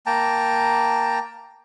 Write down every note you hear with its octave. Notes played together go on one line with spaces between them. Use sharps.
A#3 G5 A5 A#5